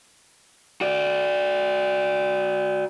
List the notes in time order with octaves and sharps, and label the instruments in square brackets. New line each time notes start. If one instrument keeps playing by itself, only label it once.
[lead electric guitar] F#4 D5